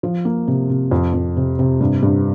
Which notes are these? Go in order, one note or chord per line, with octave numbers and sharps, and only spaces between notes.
F3
A#3
C3
C3
F2
F2
C3
C3
G2
G2